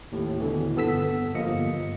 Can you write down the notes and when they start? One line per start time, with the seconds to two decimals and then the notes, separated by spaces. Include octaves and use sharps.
0.12 D#2 A2
0.40 B2 D3 E3
0.75 G1 G2 B3 A4 E6 B6
1.34 G1 F3 A#3 D#5 C#7